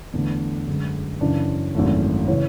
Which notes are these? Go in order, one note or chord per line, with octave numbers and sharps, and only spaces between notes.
E2 D3 A3 D4
F#2 D3 G#3
F#2 C#3 E3 D4
G#1 F#2 E3 A3
C#3 E3 C#5